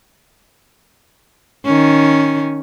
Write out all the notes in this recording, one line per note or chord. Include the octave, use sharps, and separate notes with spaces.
D#3 C#4